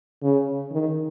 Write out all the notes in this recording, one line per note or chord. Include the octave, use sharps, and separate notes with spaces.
C#3
D#3